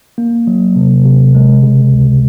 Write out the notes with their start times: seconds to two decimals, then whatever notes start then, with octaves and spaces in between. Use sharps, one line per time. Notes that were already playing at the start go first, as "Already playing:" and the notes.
0.18 A#3
0.47 F#3
0.76 C3
1.05 C3
1.34 G#3
1.63 C#3
1.92 C#2